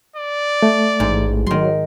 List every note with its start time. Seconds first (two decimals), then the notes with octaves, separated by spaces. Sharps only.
0.16 D5
0.62 A3
1.00 A1 G#2
1.47 D#3 F#3 C6